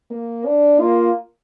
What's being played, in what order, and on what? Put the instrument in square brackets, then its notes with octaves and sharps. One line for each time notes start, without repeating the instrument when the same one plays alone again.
[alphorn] A#3
D4
[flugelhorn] A#3 [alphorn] F4